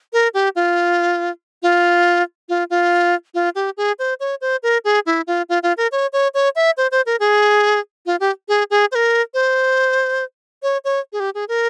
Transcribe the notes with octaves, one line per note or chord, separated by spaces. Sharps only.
A#4
G4
F4
F4
F4
F4
F4
G4
G#4
C5
C#5
C5
A#4
G#4
E4
F4
F4
F4
A#4
C#5
C#5
C#5
E5
C5
C5
A#4
G#4
F4
G4
G#4
G#4
C5
A#4
C5
C#5
C#5
G#4
G4
G#4
A#4